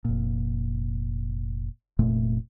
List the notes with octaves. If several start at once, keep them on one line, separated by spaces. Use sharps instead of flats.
F1 A#2
F1 A#2 A3